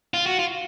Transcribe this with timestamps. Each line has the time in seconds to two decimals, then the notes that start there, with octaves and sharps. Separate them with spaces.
0.14 F4
0.26 F#4
0.39 F4